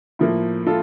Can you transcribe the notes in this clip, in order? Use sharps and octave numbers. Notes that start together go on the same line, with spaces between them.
A2 F3 A#3
F4 A4